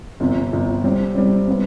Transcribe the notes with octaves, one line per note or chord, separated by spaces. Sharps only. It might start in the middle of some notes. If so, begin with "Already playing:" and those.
G1 F2 C3
G1 F2 C3
C3 G3 C4
C3 G3 C4
C3 G3 B3